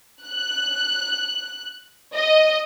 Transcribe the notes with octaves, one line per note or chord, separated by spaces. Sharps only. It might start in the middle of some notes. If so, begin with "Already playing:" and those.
F#6
D#5